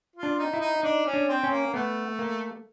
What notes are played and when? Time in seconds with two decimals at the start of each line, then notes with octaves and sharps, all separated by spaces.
0.16 F4
0.23 D4
0.39 D#4
0.53 E4
0.61 D#4
0.83 D4 D#4
1.06 C#4
1.13 D4
1.29 C4
1.43 C#4
1.51 A#3
1.74 A3 B3
2.19 A#3